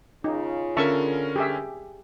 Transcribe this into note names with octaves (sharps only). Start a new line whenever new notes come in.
C#3 D#4 F4
D3 C#4 A#4 E5 A5 C#6
G4 G#4 E5